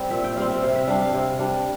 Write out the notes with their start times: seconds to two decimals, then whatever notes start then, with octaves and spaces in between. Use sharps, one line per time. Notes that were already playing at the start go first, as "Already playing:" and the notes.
Already playing: G3 C4 C5
0.10 A#2 E5
0.24 G5
0.36 G3 C4 F5
0.49 E5
0.63 C3 F5
0.75 E5
0.87 G3 D4 F5
1.01 F5
1.13 C3
1.39 G3 D4